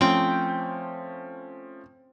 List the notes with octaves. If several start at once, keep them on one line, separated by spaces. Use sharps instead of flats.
F3 A3 C4 C#4 G5